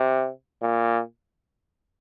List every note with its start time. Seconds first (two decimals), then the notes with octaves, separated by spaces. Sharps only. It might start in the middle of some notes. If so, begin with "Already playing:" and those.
Already playing: C3
0.62 A#2